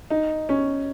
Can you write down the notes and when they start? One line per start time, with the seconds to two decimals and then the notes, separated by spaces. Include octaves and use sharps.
0.10 D#4
0.49 C#4